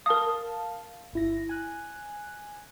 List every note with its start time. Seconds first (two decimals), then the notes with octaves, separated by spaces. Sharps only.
0.06 A#4 F5 A5 D#6
1.13 G1 E4 A#6
1.49 G#5 F#6